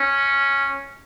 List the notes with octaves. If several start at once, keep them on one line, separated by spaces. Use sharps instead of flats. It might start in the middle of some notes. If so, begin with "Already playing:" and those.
Already playing: C#4